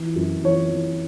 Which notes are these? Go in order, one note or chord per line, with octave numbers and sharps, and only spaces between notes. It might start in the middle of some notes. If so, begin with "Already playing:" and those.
Already playing: E3
F#2
E3 C#5
E3